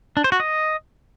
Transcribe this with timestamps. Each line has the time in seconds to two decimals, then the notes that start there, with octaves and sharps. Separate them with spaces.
0.17 D4
0.24 C5
0.32 F#4
0.40 D#5